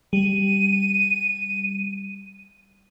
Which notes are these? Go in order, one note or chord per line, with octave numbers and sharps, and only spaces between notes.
G3 D#7